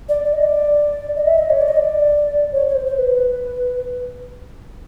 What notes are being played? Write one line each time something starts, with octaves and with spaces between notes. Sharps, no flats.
D5
D5
D#5
D5
D#5
E5
D#5
C#5
D5
D#5
D5
C#5
C#5
C5
C5
B4